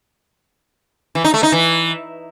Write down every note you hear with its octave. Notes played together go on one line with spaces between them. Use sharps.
E3
D#4
A3
D#4
E3